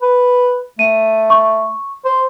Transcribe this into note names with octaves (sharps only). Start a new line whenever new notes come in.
B4
A3 D#7
C#6
C5